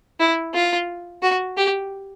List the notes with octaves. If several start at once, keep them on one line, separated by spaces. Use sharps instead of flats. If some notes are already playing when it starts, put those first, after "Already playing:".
E4
F4
F#4
G4